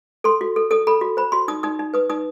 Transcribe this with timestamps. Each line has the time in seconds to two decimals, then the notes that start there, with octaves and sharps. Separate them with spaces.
0.24 A4 C6
0.41 F#4
0.56 A4
0.71 A4 D#6
0.87 A4 B5
1.01 F#4
1.17 C5 B5
1.32 F#4 C6
1.48 D#4 D#6
1.63 D#4 D#6
1.79 D#4
1.94 B4 D#6
2.10 D#4 D#6